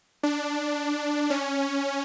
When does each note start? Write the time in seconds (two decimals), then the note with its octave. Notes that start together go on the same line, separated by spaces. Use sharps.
0.23 D4
1.30 C#4